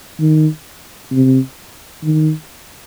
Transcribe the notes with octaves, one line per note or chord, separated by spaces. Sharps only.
D#3
C3
D#3